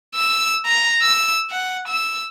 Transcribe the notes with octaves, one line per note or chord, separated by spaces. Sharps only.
E6
A#5
E6
F#5
E6